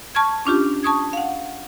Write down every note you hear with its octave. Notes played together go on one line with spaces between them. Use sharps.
A5 C#6 F6 G#6
C#4 D4 F4 G4
A5 C#6 D#6 G#6
F5 F#5